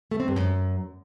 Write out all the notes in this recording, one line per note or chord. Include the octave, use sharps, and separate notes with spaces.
A3
C4
G2
F#2